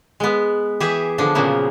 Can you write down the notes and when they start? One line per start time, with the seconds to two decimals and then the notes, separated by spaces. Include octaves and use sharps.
0.20 G#3 B3
0.80 E3 G4 G#4 E5
1.18 D3 F3 D4
1.35 A#2 C#3 F3 F#3 A#3 B3